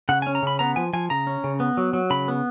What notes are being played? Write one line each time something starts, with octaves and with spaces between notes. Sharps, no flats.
C#3 F#5
G#5
C#4
A#5
C#3 B5
B3 A#5
F3 G#5
F3 G#5
C#3 A#5
C#4
C#3
B3
F#3
F#3
C#3 B5
B3